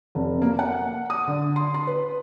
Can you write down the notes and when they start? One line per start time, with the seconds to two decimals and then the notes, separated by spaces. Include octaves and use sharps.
0.15 F1
0.42 A#3
0.59 F#5
1.10 D#6
1.27 D3
1.56 C6
1.74 C6
1.87 B4